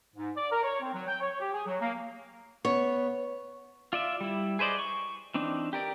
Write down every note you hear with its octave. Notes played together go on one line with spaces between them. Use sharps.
G#2
D5
A#4
C#5
C4
F#3
G5
C#5
G4
G#4
F#3
A#3
B3 C#5
F4 D5 E5
G3 E4
G#4 B4 C5 D5 D#5
C#6
E3 C4 D4 D#4
G4 A#4 D5